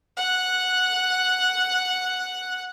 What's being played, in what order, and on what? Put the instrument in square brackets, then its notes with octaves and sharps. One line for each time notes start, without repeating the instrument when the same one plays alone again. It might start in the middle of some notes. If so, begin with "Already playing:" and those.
[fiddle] F#5 F#6